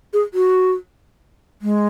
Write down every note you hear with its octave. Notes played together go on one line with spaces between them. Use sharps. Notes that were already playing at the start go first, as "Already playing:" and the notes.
G#4
F#4
G#3